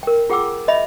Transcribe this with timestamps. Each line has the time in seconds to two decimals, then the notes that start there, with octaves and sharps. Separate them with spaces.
0.03 A#4 G5
0.30 F4 G#4 F#5 G5 D6 E6
0.68 C#5 D#5 E5 B5